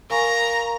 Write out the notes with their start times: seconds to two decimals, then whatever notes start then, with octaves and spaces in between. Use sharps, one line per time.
0.10 A#4 F5 G#5 A#5 C#6